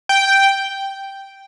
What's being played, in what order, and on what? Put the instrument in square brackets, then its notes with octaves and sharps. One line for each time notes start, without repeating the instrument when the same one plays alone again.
[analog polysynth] G5